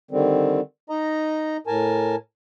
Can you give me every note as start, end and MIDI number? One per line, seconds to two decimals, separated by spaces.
0.11 0.60 50
0.11 0.60 51
0.11 0.60 55
0.11 0.60 60
0.90 1.57 63
0.90 1.57 75
0.90 1.57 82
1.67 2.16 45
1.67 2.16 70
1.67 2.16 80
1.67 2.16 81